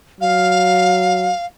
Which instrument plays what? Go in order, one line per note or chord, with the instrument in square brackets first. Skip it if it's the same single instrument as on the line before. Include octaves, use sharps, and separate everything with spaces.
[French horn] F#3 [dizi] F5